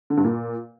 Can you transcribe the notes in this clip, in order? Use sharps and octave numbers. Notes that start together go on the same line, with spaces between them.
D3
G2
A#2